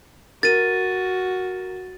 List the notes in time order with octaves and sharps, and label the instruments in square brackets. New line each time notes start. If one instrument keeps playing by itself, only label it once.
[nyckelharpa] F#4 [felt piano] A#4 [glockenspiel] A6 D#7